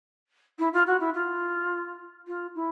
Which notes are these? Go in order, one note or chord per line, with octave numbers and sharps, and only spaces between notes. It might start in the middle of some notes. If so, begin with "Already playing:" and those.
E4
F4
F#4
E4
F4
F4
E4